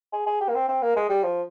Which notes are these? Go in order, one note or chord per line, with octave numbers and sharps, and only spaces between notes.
G#4
G#4
G4
A#3
C4
C4
A#3
G#3
G3
F3